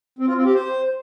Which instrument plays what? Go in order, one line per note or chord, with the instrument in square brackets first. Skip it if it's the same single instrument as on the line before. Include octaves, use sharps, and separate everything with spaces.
[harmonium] C4
F4
C4
G4
C5